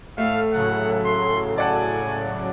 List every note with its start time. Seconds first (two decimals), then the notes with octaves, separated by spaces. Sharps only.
0.18 A2 A3 A4 F5 F6
0.53 A2 C#3 F#3 F#5
1.05 C6
1.58 D5 F#5 G#5 A5